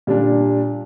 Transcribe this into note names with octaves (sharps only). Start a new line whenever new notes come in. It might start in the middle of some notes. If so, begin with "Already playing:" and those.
A#2 G3 D4